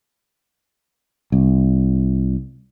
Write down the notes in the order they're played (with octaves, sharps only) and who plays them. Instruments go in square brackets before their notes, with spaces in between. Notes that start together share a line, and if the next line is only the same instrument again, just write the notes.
[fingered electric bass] C2